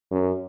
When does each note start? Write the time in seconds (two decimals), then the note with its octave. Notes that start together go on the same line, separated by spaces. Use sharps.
0.11 F#2